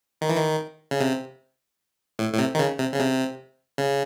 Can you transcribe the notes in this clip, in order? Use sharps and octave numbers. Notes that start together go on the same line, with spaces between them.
D#3
E3
D#3
C#3
C3
A2
A2
C3
D#3
C#3
C3
C#3
C3
C#3